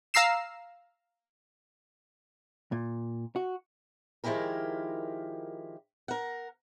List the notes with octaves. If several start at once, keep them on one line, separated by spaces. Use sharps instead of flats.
F5 A#5 E6 C7 E7
A#2
F#4
D#3 F3 G#3 E4 G4 A#4
A#4 F#5